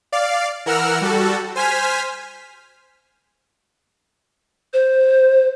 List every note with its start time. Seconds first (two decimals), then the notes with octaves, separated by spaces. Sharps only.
0.12 D5 F5
0.66 E3 A#4 F#5 E6 F6
1.01 G3 F#4 A4
1.55 C5 G#5 F6 B6
4.73 C5